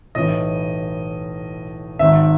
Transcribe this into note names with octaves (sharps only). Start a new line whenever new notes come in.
B1 A2 E3 D#5
G#1 G#2 D#3 E5